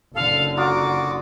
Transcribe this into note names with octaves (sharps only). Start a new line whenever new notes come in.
F#1 D3 A4 F5
F#3 F4 F#4 D6 D#6